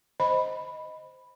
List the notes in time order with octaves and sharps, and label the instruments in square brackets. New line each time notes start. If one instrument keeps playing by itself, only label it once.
[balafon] C5 D#5 B5